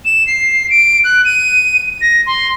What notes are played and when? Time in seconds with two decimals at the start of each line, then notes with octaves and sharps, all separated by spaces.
0.05 E7
0.27 C7
0.70 D7
1.04 F#6
1.25 D#7
2.01 A#6
2.26 C6